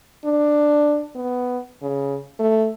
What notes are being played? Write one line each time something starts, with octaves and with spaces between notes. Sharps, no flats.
D4
B3
C#3
A3